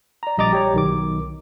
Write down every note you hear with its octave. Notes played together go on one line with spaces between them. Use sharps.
D5 A#5
A#1 G3 D#5 A#5 D6 A6
G4 C#5 A#5
B1 D#3 D6